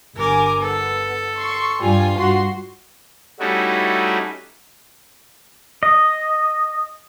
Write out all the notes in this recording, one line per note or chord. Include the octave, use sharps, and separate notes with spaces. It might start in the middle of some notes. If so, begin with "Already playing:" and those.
G1 A#4 G#5 D6
B3 A4
C6 C#6
G2 G3 F4 G#5
G2 F#4 C6
G3 A3 C#4 D#4 E4 F#4
D#5